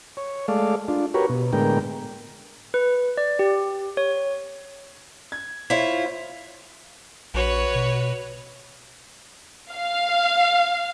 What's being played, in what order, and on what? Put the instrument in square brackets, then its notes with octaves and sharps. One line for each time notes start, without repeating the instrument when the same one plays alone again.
[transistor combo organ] C#5
G#3 A3 A4 D5 F5
D4 F4
F#4 G4 A#4 B4 C#5
B2
A2 D3 G#3 B3 A#4 G5
[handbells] B4
D5
G4
C#5
[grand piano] G#6
[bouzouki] E4 F4 [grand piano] C5 C#5
[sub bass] A#1 [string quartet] F#4 B4 C#5
[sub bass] B2
[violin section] F5